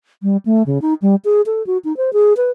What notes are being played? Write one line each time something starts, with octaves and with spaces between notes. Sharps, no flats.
G3
A3
C#3
D#4
G3
G#4
A4
F#4
D#4
C5
G#4
B4